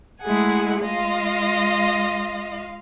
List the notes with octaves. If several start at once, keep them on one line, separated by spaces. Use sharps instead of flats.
G#3 A3 E4 G#4 F#5 G#5
G#3 F4 D#5 F5